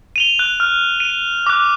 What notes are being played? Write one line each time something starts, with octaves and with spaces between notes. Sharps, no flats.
D#7 F7 G7
F#6
F6
D#7
D6 F#6